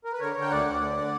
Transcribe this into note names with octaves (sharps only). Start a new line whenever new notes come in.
A#4
B4
D3 A#4 C#5
D3
G5
D2 D5 F#5
D2
D3
D3